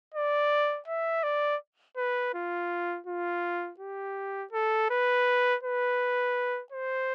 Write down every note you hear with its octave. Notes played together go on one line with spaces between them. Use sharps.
D5
E5
D5
B4
F4
F4
G4
A4
B4
B4
C5